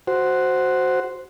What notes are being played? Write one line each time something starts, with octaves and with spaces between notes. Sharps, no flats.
F#4 C5